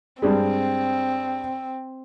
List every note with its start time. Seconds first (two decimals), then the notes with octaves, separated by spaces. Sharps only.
0.22 G2 G3 G#3 C4